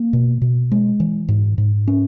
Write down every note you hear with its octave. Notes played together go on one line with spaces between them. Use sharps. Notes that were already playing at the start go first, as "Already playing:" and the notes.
Already playing: A#3
B2
B2
G#3
E3
G#2
G#2
C#4